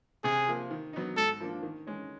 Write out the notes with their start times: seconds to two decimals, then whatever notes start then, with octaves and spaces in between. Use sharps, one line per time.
0.24 C3 G#4
0.47 F3 A#3
0.71 D#3
0.93 F#3 B3 D#4
1.17 G#2 A4
1.40 F3 A#3 D4
1.63 D#3
1.87 G#3 C#4